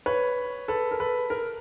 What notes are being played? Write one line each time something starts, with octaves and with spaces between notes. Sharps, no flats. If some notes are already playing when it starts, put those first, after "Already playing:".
B4 C#5
A4 B4
A#4
A4 B4
A#4